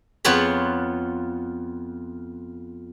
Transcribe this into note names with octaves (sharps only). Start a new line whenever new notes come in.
F2 B3 F4 B4 C#5 B5